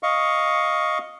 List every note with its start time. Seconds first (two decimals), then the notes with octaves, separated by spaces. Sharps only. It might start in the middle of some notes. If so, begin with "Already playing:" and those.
0.03 D#5 F5 C#6